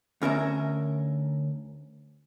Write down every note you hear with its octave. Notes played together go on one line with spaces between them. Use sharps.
D2 C#4 A#4 E5